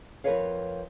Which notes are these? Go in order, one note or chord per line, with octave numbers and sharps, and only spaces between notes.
F2 E3 A#4 B4 C#5 F5